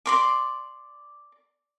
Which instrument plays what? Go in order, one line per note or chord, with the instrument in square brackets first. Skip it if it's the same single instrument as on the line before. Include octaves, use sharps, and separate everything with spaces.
[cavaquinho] D5 C6 D6